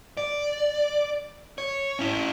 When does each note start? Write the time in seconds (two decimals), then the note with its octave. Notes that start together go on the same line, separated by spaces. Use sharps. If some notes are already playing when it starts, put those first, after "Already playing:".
0.17 D5
1.58 C#5
1.99 C#4 E4